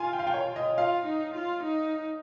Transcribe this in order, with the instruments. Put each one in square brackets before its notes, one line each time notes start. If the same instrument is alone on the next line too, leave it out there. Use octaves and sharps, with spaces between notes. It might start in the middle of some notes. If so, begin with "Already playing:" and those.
Already playing: [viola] F4 [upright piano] G#5
[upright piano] G5
F5
G5
C#5
D#5
[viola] F4 [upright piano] F5
[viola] D#4
F4
D#4